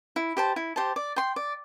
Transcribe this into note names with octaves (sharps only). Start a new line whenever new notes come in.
E4
G4 C5 A5
E4
G4 C5 A5
D5
G5 C6
D5